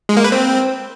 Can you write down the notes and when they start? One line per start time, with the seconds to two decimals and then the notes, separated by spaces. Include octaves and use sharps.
0.09 G#3
0.17 A#3
0.24 B4
0.32 C4